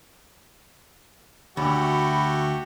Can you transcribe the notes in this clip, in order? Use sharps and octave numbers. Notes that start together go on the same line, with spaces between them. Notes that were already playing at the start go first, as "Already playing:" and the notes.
D2 A3 F#4 G4 B5